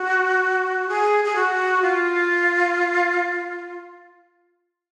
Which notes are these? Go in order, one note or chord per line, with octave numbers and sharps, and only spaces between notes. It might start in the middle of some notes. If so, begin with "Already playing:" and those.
Already playing: F#4
G#4
G#4
F#4
F4